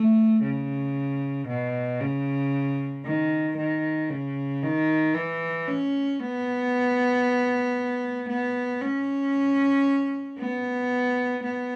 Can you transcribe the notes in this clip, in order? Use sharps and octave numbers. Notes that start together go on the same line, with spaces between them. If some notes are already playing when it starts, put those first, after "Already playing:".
Already playing: A3
C#3
B2
C#3
D#3
D#3
C#3
D#3
E3
C#4
B3
B3
C#4
B3
B3